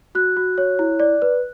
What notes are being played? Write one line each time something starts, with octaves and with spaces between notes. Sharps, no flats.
F#4 F#6
F#4
C#5
E4
D5
B4